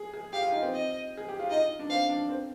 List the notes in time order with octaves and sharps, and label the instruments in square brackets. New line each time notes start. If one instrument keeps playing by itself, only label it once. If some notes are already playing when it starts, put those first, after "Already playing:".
Already playing: [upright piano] G#4
G#4
[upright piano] G4 [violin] F5
[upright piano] F4
D#4
C4
[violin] D#5
[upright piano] G#4
G4
F4
[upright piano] D#4 [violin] D#5
[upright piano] D4
[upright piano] C4 [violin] F5
[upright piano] D4
C4